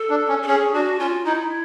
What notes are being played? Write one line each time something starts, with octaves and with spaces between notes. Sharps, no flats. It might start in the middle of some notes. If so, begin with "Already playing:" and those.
Already playing: A4
D4
C#4
A4
C#4 G#4
D4 F#4
C#4 F4
D#4 E4